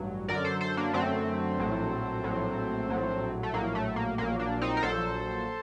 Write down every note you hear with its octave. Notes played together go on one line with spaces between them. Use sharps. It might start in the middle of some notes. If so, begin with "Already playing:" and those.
Already playing: A1 G2 F#3
F#2 D3 F#3 A#4 D5
A4 C5
A4 C5
A#3 D4
F#2 D3 F#3 A3 C4
A#1 A2 F#3
A#1 A2 F#3
A#1 A2 F#3
A3
A#1 A2 F#3 A#3
A3
A#3
A#1 A#2 F#3 A#3
A#3 D4
C4 D#4
A#4
A#1 A#2 F#3 A4 C5